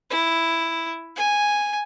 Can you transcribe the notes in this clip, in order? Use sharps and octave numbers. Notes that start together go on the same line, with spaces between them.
E4
G#5